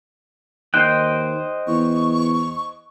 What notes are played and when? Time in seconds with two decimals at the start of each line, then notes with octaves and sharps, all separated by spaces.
0.74 D#2 C5 D#5 G5 F#6
1.67 E2 C#6